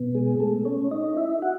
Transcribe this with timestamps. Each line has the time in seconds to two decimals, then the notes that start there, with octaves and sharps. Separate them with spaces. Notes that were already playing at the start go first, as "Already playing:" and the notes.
Already playing: B2 B3
0.15 G#3 G#4
0.40 A3 A4
0.65 C#4 C#5
0.91 D#4 D#5
1.16 E4 E5
1.42 F#4 F#5